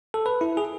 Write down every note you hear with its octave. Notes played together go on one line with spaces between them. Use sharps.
A4
B4
E4
G#4